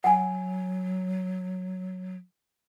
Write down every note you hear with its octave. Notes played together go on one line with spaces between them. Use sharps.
F#3 F#5 G#5